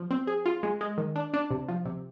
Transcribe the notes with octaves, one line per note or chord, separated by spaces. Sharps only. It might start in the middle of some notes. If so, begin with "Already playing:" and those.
Already playing: F3
C4
G#4
F4
G#3
G#3
D#3
D4
D4
C3
F3
C3